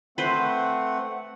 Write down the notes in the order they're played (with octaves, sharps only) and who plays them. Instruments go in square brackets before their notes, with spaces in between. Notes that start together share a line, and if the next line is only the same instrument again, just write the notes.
[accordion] A3 C4 F#5 [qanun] B4 C5